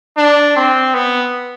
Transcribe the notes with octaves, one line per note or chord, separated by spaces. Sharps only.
D4
C4
B3